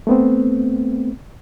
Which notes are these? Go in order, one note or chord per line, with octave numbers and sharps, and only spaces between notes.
A3 B3 C4